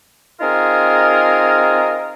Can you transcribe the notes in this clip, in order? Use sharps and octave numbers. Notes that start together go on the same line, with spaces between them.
C4 D#4 F4 G#4 A#4